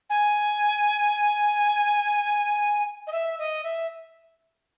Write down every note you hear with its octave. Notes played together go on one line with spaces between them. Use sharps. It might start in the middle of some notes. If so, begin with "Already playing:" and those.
G#5
D#5
E5
D#5
E5